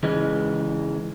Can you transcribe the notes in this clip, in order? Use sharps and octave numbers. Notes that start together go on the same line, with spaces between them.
G#2 C#3 E3 G#3